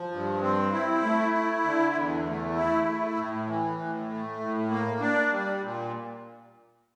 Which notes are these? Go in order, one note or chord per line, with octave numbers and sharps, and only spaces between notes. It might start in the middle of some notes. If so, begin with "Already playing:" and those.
Already playing: F3
G2
C4
E4
A3
E4
D3
E2
A3
E4
A3
A2
E3
A2
A3
A2
A#3
D4
G3
A#2